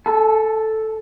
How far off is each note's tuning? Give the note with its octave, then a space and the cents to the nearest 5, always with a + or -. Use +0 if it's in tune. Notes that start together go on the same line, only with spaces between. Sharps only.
A4 +0 G#5 +45